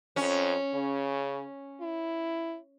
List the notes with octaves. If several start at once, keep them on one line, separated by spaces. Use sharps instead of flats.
F2 C#4
C#3
E4